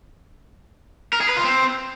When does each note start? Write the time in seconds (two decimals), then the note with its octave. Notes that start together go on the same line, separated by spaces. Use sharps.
1.13 A#4
1.21 G#4
1.29 B4
1.37 F4
1.45 C4